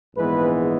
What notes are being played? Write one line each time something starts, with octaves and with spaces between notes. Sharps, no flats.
A#1 G#2 E3 G#3 B3 B4